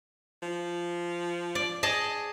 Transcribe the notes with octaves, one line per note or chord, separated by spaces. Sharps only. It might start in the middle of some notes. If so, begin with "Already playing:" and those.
F3
D5
G#4 D#5 A5